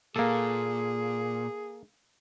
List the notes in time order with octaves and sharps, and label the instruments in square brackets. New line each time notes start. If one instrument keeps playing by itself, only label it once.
[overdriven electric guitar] A#2 [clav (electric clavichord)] A#3 A4 [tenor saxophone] G#4